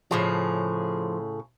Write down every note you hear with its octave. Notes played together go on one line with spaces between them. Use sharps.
A2 C#3 F3 G#4